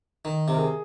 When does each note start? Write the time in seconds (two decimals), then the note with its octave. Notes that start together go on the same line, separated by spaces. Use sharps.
0.25 D#3
0.48 C3
0.54 A#4
0.59 G#4